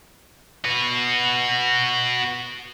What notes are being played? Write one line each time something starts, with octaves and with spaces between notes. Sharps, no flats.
F#4 B4